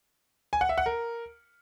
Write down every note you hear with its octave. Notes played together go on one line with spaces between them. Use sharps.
G#5
F#5
E5
F#5
A#4